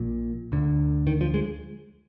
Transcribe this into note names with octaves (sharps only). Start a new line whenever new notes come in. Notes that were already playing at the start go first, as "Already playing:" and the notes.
Already playing: A#1 A#2
D2 D3
D#3
F3
G#3